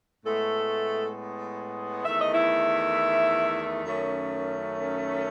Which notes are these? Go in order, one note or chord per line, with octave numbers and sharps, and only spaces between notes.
A2 G#3 A3 B3 A4
E2 D#3 A3 E5
D#5
E4 E5
F#2 D#3 A3 C#4